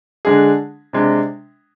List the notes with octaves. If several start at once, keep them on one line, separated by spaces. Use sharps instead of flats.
D3 G#3 D4 G#4
C3 G#3 D4